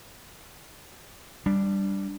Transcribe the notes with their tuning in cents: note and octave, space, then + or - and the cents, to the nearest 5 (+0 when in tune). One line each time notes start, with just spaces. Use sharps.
G3 +0 D4 +0